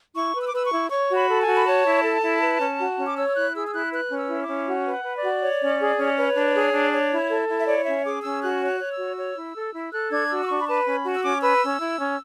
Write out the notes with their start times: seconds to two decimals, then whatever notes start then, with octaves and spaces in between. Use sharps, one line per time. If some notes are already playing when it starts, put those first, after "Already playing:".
0.16 E4 C#6
0.35 B4
0.41 E6
0.48 D6
0.53 B4 E6
0.66 C#6
0.72 E4
0.90 C#5 C#6
1.10 F#4
1.15 B5
1.28 A4
1.42 G#5
1.47 F#4
1.57 B5
1.65 C#5 A5
1.85 E4
2.04 A4
2.23 E4
2.40 B4
2.60 C#4
2.78 F#4
2.97 C#4
3.06 D6
3.16 C#5 E6
3.28 E6
3.35 E4 F#6
3.53 G#4 E6
3.66 E6
3.72 E4 F#6
3.91 B4 F#6
4.10 C#4
4.16 E6
4.29 E4
4.42 D6
4.47 C#4
4.66 F#4
4.85 B4
4.91 F#5
5.05 B4
5.16 D5
5.23 F#4
5.42 C#5
5.61 C#4
5.78 G#4
5.98 C#4
6.16 B4 C#5
6.35 D4
6.54 G#4
6.72 D4
6.92 C#5
7.11 E4
7.29 A4
7.48 E4
7.61 E5
7.66 C#5 D5
7.86 C#4 E5
8.04 G#4 D6
8.23 C#4 E6
8.42 F#4 F#6
8.61 C#5
8.67 F#6
8.79 C#5
8.92 E6
8.98 F#4
9.17 C#5
9.36 E4
9.55 A4
9.73 E4
9.92 A4 F#6
10.10 D4 G#6
10.30 F#4 E6
10.41 D6
10.48 D4 C#6
10.60 B5
10.67 B4 A5
10.86 C#4 B5
11.05 F#4
11.14 E6
11.23 C#4 D6
11.42 B4 E6
11.61 C#4
11.80 E4
11.98 C#4